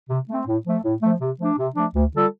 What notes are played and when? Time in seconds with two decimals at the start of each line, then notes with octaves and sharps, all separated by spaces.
0.09 C3
0.28 A3 C4
0.47 A2
0.65 F3 A3
0.84 A2
1.03 F3 A3
1.21 C3
1.40 F3 A3 D4
1.58 C3
1.76 F3 A3 D4
1.95 D2
2.14 D3 G3 F4 A4